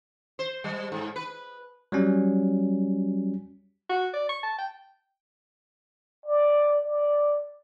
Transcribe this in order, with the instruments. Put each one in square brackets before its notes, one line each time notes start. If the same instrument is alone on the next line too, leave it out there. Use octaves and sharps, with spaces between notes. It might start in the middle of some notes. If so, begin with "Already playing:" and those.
[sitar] C5
G3
G#2
B4
[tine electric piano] F#3 G3 C#4
[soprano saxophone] F#4
D5
C#6
A5
G5
[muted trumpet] D5
D5